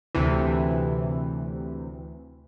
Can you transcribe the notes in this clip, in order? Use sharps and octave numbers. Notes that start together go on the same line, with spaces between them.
D2 C3 E3